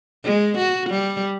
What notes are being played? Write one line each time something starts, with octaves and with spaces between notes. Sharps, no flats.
G#3
F#4
G3